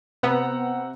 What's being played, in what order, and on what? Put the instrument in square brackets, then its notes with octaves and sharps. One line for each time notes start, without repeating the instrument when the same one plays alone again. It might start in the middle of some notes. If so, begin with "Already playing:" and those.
[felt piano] C3 F#5 [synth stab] B3 [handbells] C5 A#5 E6